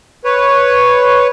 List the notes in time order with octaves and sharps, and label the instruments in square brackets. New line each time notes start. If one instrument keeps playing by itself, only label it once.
[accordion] B4 C#5